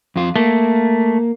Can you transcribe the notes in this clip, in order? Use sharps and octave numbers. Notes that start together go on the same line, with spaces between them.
F2 F4
A3 A#3